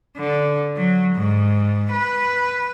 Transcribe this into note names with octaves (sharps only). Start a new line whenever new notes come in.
D3
F#3
G#2
B4